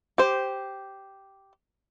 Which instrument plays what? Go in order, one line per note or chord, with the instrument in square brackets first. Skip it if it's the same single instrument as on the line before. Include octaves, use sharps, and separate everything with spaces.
[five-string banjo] G4 C5